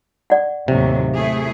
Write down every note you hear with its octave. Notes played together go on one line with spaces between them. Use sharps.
D5 F#5
D#2 A2 C3 F#3
A3 E4 G#4